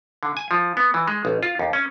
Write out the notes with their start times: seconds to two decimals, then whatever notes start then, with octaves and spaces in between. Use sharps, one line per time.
0.23 D3
0.37 G#5
0.51 F3
0.77 B3
0.94 E3
1.08 G#3
1.25 A1
1.43 F4
1.59 D#2
1.73 C#4